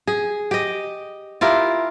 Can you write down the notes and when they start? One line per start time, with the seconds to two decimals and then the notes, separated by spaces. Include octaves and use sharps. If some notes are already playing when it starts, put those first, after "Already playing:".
0.07 G#4
0.51 G4 D#5
1.41 E4 F4 G4 A#4